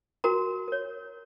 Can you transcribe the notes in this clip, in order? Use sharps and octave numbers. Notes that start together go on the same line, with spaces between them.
F#4 A#4 A#5
A#4 C#5